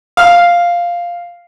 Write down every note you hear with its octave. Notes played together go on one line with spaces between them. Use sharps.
F5